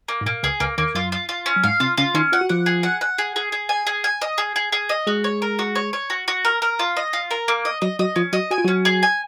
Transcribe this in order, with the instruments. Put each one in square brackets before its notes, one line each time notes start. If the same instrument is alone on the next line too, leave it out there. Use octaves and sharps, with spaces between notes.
[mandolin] A#3
[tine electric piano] G#2
[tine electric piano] A#2 [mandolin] A#3
[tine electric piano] C#2 C#3 [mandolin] G#4
[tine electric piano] C#2 C#3 [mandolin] A#3
[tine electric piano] D#2 D#3 [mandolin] A#3
[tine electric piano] F#2 F#3 [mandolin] F4
[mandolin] F4
F4
C#4
[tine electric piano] F#3
[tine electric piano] G#2 G#3 [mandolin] F5
[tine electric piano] C3 C4 [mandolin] F4
[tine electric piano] C#3 C#4 [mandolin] F4
[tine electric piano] D#3 D#4 [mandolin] C#4
[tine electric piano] F4 [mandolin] F#5
[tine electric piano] F#4
[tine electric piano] F3 F4 [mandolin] F#5
[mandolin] G#4
F#5
F#5
G#4
G#4
G#4
G#5
G#4
G#5
D#5
G#4
G#4
G#4
D#5
[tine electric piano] G#3 G#4 [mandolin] F#4
[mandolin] C#5
A#4
F#4
C#5
C#5
F#4
F#4
A#4
A#4
F4
D#5
F4
A#4
A#3
D#5
[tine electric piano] F#3 F#4 [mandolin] D#5
[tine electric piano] F#3 F#4 [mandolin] D#5
[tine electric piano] F3 F4 [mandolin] C#4
[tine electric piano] F#3 F#4 [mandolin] D#5
[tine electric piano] F#4 [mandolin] G#5
[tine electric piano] F4
[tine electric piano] F#3 F#4 [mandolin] C#4
[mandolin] G#4
G#5